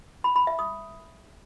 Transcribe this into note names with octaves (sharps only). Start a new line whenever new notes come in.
B5
B5
E5
D#6